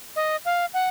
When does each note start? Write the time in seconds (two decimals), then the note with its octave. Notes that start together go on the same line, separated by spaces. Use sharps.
0.16 D#5
0.45 F5
0.74 F#5